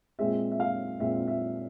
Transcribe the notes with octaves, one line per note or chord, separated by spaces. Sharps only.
A#2 G#3 C4 E5
E5
F5
A#2 G#3 C4 E5
E5